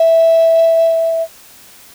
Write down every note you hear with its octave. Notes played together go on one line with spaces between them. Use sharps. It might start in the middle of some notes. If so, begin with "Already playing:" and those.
Already playing: E5